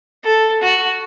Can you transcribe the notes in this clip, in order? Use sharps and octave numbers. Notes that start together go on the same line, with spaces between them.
A4
F#4